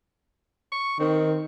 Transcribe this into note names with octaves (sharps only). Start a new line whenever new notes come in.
C#6
D#3 C4